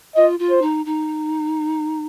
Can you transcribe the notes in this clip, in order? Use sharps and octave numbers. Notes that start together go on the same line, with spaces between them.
F4 D#5
F4
C5
D#4
D#4